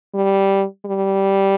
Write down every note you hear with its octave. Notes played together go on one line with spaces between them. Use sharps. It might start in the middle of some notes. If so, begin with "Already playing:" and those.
G3
G3